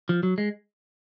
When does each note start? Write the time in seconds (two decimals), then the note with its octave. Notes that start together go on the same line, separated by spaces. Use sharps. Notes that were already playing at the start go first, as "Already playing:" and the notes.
0.09 F3
0.23 F#3
0.38 G#3